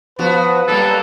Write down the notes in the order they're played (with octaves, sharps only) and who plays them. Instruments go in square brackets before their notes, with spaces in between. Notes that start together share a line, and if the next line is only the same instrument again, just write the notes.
[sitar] F3 B3 F#4 [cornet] B4
[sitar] F#3 G3 A#3 [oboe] A4